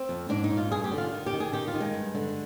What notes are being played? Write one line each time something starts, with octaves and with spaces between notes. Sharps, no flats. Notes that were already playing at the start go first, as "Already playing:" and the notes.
Already playing: C4
F2
G#2 D4
D#4
G#2
F4
G2 G#4
G4
D3
F4
D#3
G4
D#3
G#4
D#3 G4
F4
D#3
G#3
G2
D3